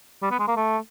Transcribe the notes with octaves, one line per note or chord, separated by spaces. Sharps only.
G3
B3
G#3
A#3
A3